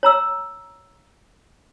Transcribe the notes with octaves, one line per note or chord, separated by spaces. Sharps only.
C#5 A#5 E6